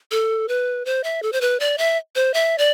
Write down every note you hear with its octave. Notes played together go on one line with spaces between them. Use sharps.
A4
B4
C5
E5
A4
C5
B4
D5
E5
C5
E5
D5